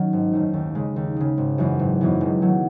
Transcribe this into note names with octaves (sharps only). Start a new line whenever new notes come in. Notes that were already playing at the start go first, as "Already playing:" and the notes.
Already playing: D#3 F#3 C#4
G#1
F#2 D#3 A3
D#2
C#3 G#3
D#2
C#3 G#3
G#1
F#2 E3 G#3 B3
G#1
F#2 E3 G#3 B3
E1
D#3 F#3 A3